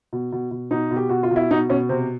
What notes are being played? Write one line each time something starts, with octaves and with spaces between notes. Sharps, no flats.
B2
B2
B2
B2 D#4
B2
G4
B2 F#4
F4
B2
E4
B2 D#4
B2 C#4
C3 C4